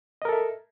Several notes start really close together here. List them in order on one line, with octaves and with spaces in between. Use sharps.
D#5 A#4 A4 E5